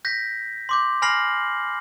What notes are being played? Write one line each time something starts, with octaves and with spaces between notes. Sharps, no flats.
G6 A#6 B6
C6 D6 G6
G#5 B5 F6 A#6 C7 F#7